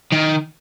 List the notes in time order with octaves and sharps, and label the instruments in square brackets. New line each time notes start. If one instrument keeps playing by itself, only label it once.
[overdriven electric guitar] D#3